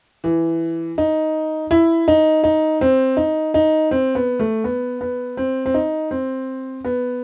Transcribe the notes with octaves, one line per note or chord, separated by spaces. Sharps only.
E3
D#4
E4
D#4
D#4
C4
D#4
D#4
C4
B3
A3
B3
B3
C4
C4
D#4
C4
B3